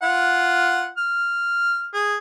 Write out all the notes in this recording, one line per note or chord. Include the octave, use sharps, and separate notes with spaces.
F4 F#5
F6
G#4